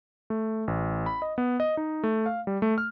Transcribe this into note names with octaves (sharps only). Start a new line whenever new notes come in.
A3
A1
B5
D#5
B3
D#5
D#4
A3
F5
G3
A3
F6